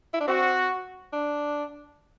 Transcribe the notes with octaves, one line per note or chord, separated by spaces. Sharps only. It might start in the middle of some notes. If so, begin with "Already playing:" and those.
E4
D4
C4 F#4
D4